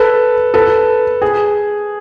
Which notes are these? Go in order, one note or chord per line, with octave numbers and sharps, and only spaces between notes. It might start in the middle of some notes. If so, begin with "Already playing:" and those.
Already playing: A4 B4
A4 B4
G#4